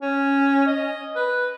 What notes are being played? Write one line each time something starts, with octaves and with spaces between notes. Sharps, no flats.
C#4
D#5
B4